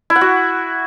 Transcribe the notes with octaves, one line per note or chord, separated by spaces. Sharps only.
E4
F#5
F#4